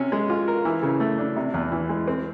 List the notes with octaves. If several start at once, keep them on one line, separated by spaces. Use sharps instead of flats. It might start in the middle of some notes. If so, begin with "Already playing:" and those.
Already playing: C3 C#4
G#3
F4
A#4
E3
C#3
A3
D4
C3
E2
E3
G#3
C4